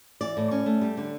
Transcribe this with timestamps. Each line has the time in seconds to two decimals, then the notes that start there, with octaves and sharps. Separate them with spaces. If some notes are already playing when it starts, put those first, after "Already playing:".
0.21 E3 D5
0.37 A2
0.51 C#4
0.66 A3
0.81 G3
0.97 D3